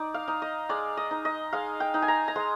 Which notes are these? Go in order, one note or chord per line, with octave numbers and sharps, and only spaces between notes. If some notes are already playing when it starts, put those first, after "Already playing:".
Already playing: D#4 D5
F5
D#4
D#5
G#3 D5
D#5
D#4
D#5
G#3 F5
G5
D#4
G#5
A#5
A#5
G#3 C6